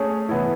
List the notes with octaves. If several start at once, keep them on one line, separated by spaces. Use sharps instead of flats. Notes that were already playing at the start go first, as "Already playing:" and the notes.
Already playing: A3 C#4 G#4 C#5
E3 B3 E4